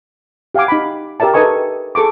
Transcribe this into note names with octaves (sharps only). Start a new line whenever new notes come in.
G4 F5 F#5 G#5 D6
D#4 B5
G4 A#4 D5 E5 A5
D#4 A4 B4 D#5 G#5 C#6
G#4 A4 C#6 D6